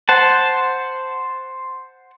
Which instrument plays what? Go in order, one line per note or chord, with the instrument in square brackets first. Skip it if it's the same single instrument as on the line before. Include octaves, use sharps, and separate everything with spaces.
[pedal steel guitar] C5 F#5 A5